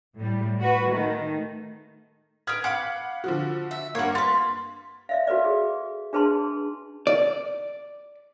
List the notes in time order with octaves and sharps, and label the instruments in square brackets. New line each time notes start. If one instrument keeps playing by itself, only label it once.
[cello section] A2 G3
F#4 B4
D#3 A3
[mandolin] A#4 B4 [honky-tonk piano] D#6 F6 G#6
[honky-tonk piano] F5 F#5 [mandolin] B5 D6
[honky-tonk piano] D3 F3 F#4
[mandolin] E5
[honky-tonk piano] G2 A#3 [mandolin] C#5 F#5
[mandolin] F4 B4 [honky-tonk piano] A6
[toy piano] D5 E5 F5
F#4 A4 B4 D5
G#4
D4 G#4 B4 A5 C6
[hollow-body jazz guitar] D5